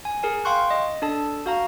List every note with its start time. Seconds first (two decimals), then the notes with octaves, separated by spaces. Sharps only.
0.05 G#5
0.23 G#4 A#4 G#5
0.45 F5 G5 C6 C#6 F#6
0.71 D#5
1.02 D4 A4 A5
1.46 F#4 F5 A#5